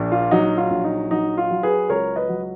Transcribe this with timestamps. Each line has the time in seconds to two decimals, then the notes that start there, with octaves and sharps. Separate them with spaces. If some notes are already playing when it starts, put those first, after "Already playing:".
Already playing: A#1 A#2
0.12 F4
0.31 F#3 D#4 F#4
0.57 F4
0.70 A#1
0.84 D#4
1.11 F#3 D#4
1.37 F4
1.51 F#3
1.63 G#4 B4
1.89 C#2 A#4 C#5
2.16 B4 D#5
2.29 F#3